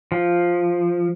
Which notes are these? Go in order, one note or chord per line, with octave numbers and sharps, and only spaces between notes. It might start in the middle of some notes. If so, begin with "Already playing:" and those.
F3